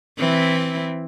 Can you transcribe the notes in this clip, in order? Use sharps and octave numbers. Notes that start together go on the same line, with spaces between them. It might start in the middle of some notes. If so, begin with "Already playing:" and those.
E3 C4 E4